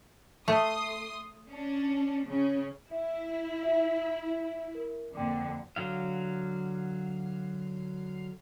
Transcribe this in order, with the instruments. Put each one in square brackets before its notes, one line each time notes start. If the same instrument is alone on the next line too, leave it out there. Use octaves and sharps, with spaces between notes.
[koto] A3 [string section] C6 D#6
[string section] C#4 D4
C#3 C#4
[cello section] E4 [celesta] E5
[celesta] F4 E5
A#4
[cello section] F2 A#2 D3 [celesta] G5 D6
[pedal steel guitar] D3 F#3 F5